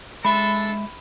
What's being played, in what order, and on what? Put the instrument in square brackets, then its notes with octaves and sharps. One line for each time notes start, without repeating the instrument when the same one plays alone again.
[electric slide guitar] G#3 E5 [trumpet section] D4 A4 [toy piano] B5